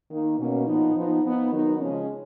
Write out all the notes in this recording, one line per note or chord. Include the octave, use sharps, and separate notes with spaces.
D#3 A#3 D#4
B2 A#3 C#4
A#2 F3 B3 D#4
F3 B3 D#4
F3 B3 D#4
D#3 F#3 B3 D#4
C#3 F3 G#3 C#4